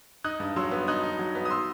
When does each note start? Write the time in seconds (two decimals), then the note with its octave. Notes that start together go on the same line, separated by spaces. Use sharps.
0.24 D#4 D#6 F#6
0.40 G2
0.56 F#3 C6 E6
0.71 B3
0.87 D#4 D#6 F#6
1.03 D#4
1.19 F#3
1.35 B3
1.45 D#6
1.50 C6 E6